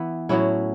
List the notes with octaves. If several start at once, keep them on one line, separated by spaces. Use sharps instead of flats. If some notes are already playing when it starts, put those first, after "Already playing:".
Already playing: E3 B3 E4
A2 F#3 C#4 E4